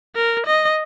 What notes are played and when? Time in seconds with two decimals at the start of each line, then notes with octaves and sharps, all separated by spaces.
0.16 A#4
0.47 D#5